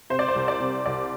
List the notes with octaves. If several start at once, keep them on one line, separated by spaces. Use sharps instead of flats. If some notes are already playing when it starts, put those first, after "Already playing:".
C3 C5
D5
C5
C2
D5
C3
C2 D5